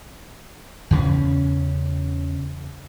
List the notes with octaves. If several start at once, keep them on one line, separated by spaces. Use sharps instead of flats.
E2 C#3 A3 C#4